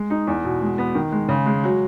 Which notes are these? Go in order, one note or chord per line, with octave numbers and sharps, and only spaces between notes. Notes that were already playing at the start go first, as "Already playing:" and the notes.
Already playing: G#3
D#4
E2
B2
G#3
B3
D#3
G#3
C#3
G#3
F#3